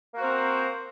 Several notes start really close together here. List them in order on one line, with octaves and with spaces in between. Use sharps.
A#3 F#4 C5 A#4 C4